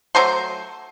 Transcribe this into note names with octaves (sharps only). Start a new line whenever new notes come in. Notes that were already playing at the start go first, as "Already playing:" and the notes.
F#3 A3 C5 C6